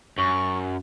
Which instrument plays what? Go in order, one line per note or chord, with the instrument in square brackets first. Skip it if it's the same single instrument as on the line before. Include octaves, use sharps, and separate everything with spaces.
[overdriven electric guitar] F#2 [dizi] C#6